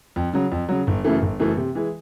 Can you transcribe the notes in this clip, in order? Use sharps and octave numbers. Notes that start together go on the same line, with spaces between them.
F2
C#3 F#3
F2
C#3 F#3
G1
F#2 C#3 E3 A3
G1
F#2 C#3 E3 A3
C3
E3 G#3